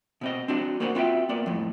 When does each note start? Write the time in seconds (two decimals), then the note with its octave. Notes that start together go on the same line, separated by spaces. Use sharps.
0.21 B2 C4 D#5
0.48 C4 D4 F#4
0.80 A#3 F#4 C5 D5 D#5 F#5
0.95 C4 F4 F#4 E5 G5
1.29 A#3 B3 D5
1.46 F2 A2